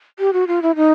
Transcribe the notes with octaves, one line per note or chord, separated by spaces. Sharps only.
G4
F#4
F4
E4
D#4